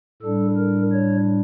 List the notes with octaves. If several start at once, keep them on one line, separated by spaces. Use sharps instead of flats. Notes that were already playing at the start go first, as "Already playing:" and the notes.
A2 G3 D4 A4
A#4
C#5